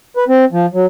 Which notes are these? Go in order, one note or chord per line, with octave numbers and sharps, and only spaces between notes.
B4
C4
F3
F#3